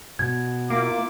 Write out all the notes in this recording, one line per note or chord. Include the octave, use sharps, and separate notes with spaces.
B2 G#6
A#3 E4 F4 D6